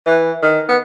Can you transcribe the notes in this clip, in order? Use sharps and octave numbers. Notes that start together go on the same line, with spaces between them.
E3
D#3
B3